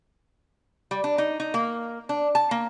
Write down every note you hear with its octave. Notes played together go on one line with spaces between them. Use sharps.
G3
D4
D#4
D#4
A#3
D4
A5
A#3